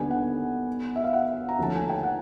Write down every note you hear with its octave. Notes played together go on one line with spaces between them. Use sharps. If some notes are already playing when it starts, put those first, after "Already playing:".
Already playing: D#2 D3 G3 B3 D4 G#5
F#5
E5
F5
F#5
A#5
D#2 D3 F3 A3 C#4 A5
G#5
G5
F#5